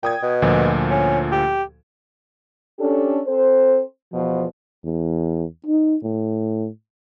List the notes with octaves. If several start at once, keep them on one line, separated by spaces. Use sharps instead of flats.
A#2 G5 D#6 G#6
B2
D2 A#2 F3
C#4
G4
C#4 D4 G4 A4
C4 A4 C5
E2 B2 F3
E2
D#4
A2